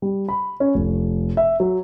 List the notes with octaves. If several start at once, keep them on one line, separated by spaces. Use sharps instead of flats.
G3
B5
C#4
F1
E5
F#3